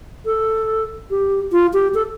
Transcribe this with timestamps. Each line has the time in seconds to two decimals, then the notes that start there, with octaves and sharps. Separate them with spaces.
0.26 A4
1.11 G4
1.52 F4
1.73 G4
1.94 A4